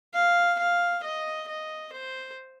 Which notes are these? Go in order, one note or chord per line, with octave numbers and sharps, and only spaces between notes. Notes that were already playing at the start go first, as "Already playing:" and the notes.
F5
F5
D#5
D#5
C5